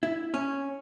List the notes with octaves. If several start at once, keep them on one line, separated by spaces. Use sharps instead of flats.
E4
C#4